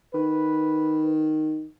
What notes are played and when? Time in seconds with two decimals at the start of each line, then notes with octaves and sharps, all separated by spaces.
0.14 D#3 B4